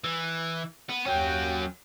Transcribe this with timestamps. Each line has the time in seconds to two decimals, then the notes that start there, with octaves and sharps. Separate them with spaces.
0.04 E3
0.89 B3
1.06 D#2 F#3 C#4 G5